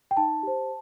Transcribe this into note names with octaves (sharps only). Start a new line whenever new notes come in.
G5
D#4 A5
G4 C5